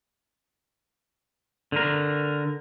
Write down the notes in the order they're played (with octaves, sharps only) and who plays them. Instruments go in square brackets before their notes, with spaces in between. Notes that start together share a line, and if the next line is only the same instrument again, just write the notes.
[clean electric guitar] D3 A#4